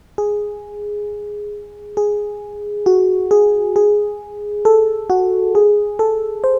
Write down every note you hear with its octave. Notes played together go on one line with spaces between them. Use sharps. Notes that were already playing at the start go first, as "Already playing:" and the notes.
G#4
G#4
F#4
G#4
G#4
A4
F#4
G#4
A4
C5